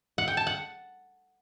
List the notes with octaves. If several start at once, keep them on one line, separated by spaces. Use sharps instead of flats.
F#5
G5
A5
F#5